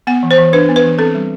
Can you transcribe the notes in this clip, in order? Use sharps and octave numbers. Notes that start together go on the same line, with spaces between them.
B3 F#5
E3
C5
E3
D4 B4
B3
B4
E3
C4 A4
G3